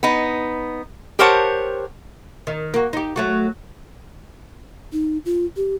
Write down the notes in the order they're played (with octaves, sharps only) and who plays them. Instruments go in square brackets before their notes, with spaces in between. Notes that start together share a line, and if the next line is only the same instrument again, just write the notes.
[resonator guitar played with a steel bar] B3 D#4
G4 A#4 C5 C#5 F#5 A5
[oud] D#3
A#3 F#4
D#4 G4
F#3 A3 F#4
[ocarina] D#4
F4
G4